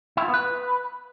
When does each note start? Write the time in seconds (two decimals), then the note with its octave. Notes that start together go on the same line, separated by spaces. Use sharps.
0.17 E4
0.23 F4
0.28 B3
0.34 B4